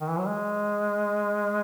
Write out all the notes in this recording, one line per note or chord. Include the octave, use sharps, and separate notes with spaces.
D#3
E3
F#3
G#3